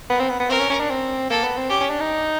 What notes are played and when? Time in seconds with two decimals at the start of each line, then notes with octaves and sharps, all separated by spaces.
0.10 B3 A#4
0.20 C4
0.30 B3
0.40 B3
0.50 C4 A#4
0.59 C#4
0.70 C#4
0.80 D4
0.90 C4
1.30 A#3 A4
1.44 B3
1.57 C4
1.70 C#4 G4
1.80 C#4
1.90 D4
2.00 D#4